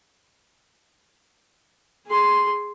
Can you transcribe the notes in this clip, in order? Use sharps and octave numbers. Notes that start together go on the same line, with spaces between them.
G#4 C6